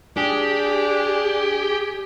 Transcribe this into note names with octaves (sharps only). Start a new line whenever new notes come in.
D4 G4 G#4